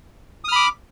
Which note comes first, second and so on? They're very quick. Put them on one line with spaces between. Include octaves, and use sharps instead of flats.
D#6 F6 B5 D6